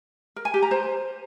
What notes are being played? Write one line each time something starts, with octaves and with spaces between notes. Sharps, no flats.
A#4
G#5
G4
A#5
C5